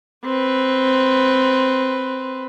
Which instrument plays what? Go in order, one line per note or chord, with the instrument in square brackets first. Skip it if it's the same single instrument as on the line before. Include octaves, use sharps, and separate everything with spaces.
[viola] C4 B4